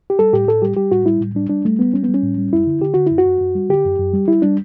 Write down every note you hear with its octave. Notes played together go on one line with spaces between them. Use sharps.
G4
G3 A4
A2 G4
A2 A4
G3 G4
G3 G4
A2 F#4
G3 E4
A2
G3 D4
G3 D4
G3 A3
G3 B3
G3 C#4
B3
G3
C#4
A2
G3
F#2 E4
D3
D3 G4
D3 F#4
F#2 E4
F#4
F#2
F#2
G3
D3 G4
F#2
F#2
G3
G3 E4
G3 D4